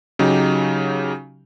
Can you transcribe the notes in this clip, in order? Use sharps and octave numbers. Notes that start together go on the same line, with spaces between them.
C#3 F#3 D#4 G4